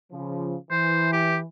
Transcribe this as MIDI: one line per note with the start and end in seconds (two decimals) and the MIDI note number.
0.12 0.55 49
0.12 0.55 53
0.71 1.44 52
0.71 1.09 72
1.12 1.37 67